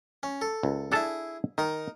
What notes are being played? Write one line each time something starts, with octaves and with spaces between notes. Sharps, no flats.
C#4
A4
C#2
D4 E4 G#4 A4 A5
D#3 D#4 A#4